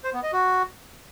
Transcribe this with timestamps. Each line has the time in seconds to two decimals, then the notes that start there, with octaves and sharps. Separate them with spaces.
0.04 C5
0.13 B3
0.23 D#5
0.33 F#4